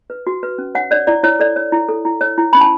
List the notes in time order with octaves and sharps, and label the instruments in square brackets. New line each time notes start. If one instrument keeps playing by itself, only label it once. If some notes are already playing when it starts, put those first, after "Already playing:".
[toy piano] B4
F#4
B4
C#4
C#5 F#5
C#5 D5
E4 D5
E4 C#5
A4 D5
C#5
E4
A4
E4
C#5
E4
C#4 B5
A5